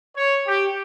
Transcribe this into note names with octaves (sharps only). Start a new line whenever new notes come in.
C#5
G4